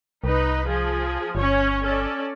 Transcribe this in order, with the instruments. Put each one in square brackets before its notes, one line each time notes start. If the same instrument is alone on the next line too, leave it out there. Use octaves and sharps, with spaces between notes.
[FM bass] C2 [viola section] D#4 B4
[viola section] F3 G#4
[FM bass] G1 [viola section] C#4 C#5
[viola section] C#4 A4 D5